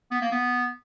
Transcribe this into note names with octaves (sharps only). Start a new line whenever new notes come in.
B3
A#3
B3